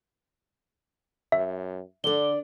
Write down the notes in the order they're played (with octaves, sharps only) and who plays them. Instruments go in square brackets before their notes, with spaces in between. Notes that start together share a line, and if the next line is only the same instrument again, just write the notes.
[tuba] F#2 [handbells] E5
[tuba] D3 [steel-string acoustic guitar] D4 D5 [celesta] A4 G7